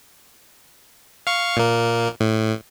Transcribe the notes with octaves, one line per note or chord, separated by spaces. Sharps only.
F5 C#6
A#2 A#3
A2